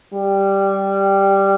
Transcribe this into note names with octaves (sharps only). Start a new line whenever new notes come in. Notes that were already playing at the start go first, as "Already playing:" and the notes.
G3